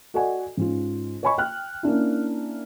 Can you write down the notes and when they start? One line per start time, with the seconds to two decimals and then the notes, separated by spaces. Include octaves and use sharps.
0.14 F#4 A4 D5 D#5 F#5 G#5
0.57 G#2 C#4 F4
1.23 C#5 D#5 G#5 B5 C#6
1.38 G5 F6 F#6
1.83 A#3 C#4 D4 E4